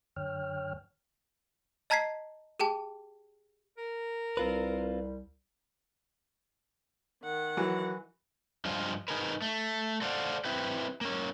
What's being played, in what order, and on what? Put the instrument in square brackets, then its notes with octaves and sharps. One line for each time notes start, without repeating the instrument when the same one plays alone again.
[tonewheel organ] F#2 D3 C#5 G5 F6
[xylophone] D#5 A5 A#5 G#6 B6 C7
G4 G#4 G5 A5
[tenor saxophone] A#4
[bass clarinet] C2 [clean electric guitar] C4 F4 B4
[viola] D#3 F#5
[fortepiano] E3 F#3
[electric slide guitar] G2 F3 G#3 F4
D#4 G#4 A#4 B4
A3
A4 C5 D5 F5 F#5
C4 E4 G4 B4
A#3 C#4